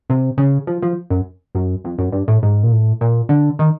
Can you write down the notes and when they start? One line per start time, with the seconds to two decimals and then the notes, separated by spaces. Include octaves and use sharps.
0.10 C3
0.38 C#3
0.67 F3
0.82 F3
1.10 F#2
1.55 F#2
1.84 F2
1.98 F#2
2.12 G2
2.28 A2
2.43 G#2
2.63 A#2
2.72 A2
3.01 A#2
3.29 D3
3.59 D#3